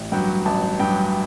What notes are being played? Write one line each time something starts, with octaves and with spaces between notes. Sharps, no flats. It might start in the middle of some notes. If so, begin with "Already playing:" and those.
Already playing: A1
G2 F#3 G5
A1 A5
G2 F#3 G5